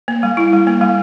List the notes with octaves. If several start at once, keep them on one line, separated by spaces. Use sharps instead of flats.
A#3
G3
E4
G3
A#3
G3